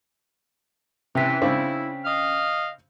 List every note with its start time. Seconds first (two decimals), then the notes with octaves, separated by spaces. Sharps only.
1.15 C3 E3 C#4 G5 B6
1.42 C#3 C4 D4 E4
2.05 D#5 F5